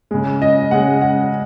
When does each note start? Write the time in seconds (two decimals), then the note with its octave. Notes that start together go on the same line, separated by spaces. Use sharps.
0.11 C#3 G#3
0.42 D#5
0.71 C#3 G#3 F#5
1.01 F#5